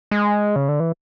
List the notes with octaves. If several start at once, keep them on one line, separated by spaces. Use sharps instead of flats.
G#3
C#3
D3
E3